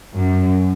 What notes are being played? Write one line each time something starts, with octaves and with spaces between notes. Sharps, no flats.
F#2